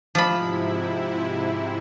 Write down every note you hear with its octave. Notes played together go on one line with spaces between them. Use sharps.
G#2 C3 F3 E4 B5